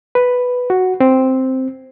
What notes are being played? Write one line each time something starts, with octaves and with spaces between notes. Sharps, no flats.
B4
F#4
C4